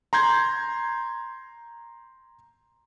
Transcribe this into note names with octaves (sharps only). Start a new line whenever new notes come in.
A#5 C6 G6 G#6